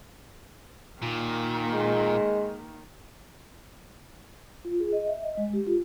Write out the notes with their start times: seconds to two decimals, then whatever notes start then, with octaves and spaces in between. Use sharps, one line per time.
1.02 A#2 D#3 A#3
1.74 G#3
4.65 F4
4.80 G#4
4.93 D#5
5.07 E5
5.23 D#5
5.37 G#3
5.53 G4
5.67 F4